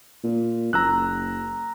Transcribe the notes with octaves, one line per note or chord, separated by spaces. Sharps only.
A#2
F#1 A#5 E6 F#6